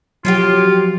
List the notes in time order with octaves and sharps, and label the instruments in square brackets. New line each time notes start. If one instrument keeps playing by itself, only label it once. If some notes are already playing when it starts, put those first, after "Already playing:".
[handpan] F3 F#3 [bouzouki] C#4 D#4 G4 [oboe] F4